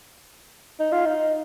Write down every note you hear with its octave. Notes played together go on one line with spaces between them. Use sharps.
D#4
F4
D#4